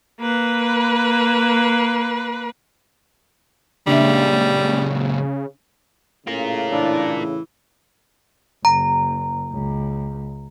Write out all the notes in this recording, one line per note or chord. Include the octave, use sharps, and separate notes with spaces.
A#3 B4
C#2 A#2 C#3 G3 D4 E5
A2 C#3 F4 A#4
E3 D4
F#1 A#5
C#2